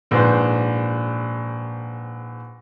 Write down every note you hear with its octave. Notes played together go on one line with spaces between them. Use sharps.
A#1 G#2 B4 C5